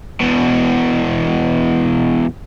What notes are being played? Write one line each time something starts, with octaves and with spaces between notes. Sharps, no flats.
E2 B2